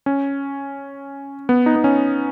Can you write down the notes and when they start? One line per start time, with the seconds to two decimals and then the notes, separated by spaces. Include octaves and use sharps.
0.06 C#4
1.49 B3
1.66 D#4
1.76 B3
1.84 C#4